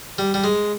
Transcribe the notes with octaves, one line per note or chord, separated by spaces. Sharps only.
G3
G3
G#3